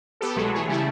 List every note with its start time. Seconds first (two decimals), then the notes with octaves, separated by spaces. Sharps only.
0.21 B3 G4 A4
0.36 C2 B2 F#3 G#3 A3
0.54 E3 A3 G#4 C#5
0.67 C#3 G3 A3 E4